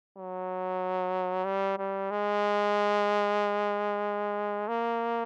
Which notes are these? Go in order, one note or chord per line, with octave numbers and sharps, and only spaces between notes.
F#3
G3
G3
G#3
A#3